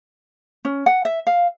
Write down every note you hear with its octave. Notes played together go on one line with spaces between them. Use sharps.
C#4
F#5
E5
F5